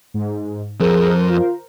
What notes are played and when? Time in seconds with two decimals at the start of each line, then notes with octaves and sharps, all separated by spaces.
0.14 G#2
0.80 F2 G#4 A#4 C5
1.30 F4